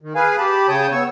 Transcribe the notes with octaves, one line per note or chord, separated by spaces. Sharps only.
D#3
G#4 B4 F5 G#5
G4 A5 B5
C#3 C#5 G5 A5 D#6 G6
B3 C#5 C#6 E6